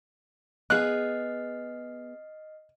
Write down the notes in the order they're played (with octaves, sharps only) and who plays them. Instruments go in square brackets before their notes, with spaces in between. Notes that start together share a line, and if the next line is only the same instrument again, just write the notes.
[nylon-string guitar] B3 G#4 [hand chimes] D#5 F6 C7 [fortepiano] F#6